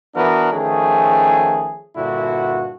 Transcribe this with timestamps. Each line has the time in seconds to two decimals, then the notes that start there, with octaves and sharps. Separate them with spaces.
0.15 E3 B3 D4 F#4 A#4 B4
0.52 D#3 F3 A3 C#4 G#4
1.96 G2 A#2 D3 E4 F#4